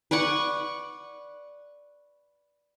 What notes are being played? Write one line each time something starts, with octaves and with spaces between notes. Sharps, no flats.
B4 D5 F#5 C#6